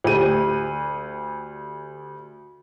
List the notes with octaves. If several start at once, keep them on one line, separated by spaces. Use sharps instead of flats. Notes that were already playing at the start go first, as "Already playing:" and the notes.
D2 G4 D#7